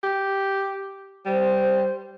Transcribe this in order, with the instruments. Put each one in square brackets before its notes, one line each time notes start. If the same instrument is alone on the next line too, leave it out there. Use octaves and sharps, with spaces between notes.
[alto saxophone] G4
[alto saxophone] G3 [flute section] C5